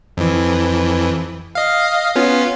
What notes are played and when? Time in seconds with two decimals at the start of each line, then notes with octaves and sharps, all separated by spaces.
0.17 F2 E3
1.55 D#5 F5
2.16 B3 C#4 F4